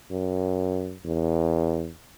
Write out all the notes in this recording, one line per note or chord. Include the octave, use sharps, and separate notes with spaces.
F#2
E2